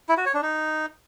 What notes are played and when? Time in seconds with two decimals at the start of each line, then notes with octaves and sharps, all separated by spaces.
0.09 E4
0.17 F#4
0.26 C#5
0.34 D4
0.43 D#4